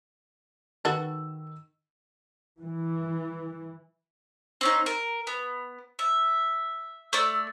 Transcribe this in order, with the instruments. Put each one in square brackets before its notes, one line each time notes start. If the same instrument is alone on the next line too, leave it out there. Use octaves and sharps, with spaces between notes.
[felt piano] D#3 E6 [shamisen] F#4 A4 B4
[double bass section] E3
[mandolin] C4 C#4 D#4
A#4
B3
E5
A3 D5 E6